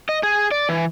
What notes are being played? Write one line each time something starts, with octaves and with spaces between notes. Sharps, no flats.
D#5
G#4
D5
E3